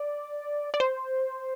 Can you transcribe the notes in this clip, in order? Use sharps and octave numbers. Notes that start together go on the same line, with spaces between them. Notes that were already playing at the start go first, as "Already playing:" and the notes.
Already playing: D5
D5
C5